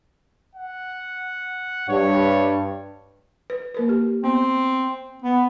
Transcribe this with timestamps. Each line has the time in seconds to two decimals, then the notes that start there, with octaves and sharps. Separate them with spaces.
0.55 F#5
1.88 G2 C#5
3.50 B4
3.75 A#3 A#4 B4
3.89 G4
4.24 B3 C4
5.23 B3